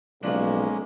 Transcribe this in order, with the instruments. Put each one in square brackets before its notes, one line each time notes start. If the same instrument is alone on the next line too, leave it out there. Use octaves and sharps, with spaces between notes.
[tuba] B1 [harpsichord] F3 D4 [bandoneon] G#3 A#3 C#4